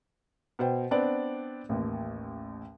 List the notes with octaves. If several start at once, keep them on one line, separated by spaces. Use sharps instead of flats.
B2 C5 G5
B3 C4 D4 D5
A1 D#2